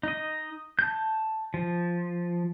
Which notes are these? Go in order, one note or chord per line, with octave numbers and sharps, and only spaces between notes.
D#4 D#5
A5 G6
F3